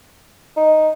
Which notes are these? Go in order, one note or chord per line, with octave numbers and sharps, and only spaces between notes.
D#4